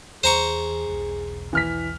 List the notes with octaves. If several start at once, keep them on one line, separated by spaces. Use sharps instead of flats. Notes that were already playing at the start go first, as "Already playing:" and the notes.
E2 G#4 C5 A#5 C#6
E1 B1
E3 F6 B6